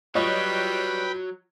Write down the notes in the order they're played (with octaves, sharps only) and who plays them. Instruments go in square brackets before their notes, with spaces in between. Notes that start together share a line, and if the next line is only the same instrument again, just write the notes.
[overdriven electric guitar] F#3 [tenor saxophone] G3 [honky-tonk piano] F4 C#5 D#5 [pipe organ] B4 G5 B5